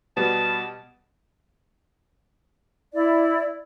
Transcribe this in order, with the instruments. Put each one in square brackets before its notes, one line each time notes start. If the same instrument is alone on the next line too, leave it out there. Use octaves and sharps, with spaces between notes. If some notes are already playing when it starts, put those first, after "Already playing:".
[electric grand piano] B2 G3 B3 [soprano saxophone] A5
[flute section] E4 D5